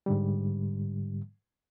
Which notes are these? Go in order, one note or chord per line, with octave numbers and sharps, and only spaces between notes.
G#2 D3 G3